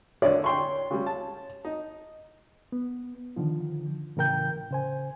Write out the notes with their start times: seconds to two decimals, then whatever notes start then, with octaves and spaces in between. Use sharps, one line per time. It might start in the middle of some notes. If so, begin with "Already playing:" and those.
0.22 D3 C#5 D5
0.44 G5 C6 C#6
0.91 C#3 G3
1.06 A5
1.65 D#4
2.72 B3
3.36 D3 D#3 F3 F4
4.17 A2 C#3 E3 A#4 G5 G6
4.71 C#3 C5 G#5